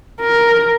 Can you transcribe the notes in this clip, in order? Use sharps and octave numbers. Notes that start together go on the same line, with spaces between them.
A#4